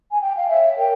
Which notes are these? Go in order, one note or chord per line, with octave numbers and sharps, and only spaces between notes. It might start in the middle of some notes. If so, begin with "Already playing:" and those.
G#5
G5
F5
C#5 E5
A#4 G5